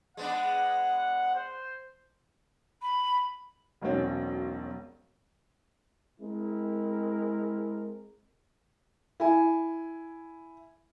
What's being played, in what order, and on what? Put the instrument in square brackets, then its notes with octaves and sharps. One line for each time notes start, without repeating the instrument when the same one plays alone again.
[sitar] G#3 B3 D4 [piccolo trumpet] F#5
[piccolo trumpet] C5
[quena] B5
[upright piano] E1 B1 F#3 C4 C#4
[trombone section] G#3 C4 E4 A#4
[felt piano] E4 G#5